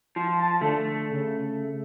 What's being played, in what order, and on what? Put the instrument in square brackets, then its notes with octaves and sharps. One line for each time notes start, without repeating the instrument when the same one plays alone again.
[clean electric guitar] F3
[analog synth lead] A5
[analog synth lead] D3 [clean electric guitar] A3
[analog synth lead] C#3